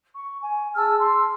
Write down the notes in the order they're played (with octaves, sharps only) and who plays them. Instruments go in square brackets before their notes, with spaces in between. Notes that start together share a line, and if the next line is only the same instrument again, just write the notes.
[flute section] C#6
G#5
G#4 A5 E6 F6
A5 C6